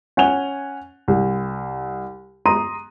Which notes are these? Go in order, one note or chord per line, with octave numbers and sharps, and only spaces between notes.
C#4 F#5 G#5 F7 G7
C2
A#5 C6 D#6 D#7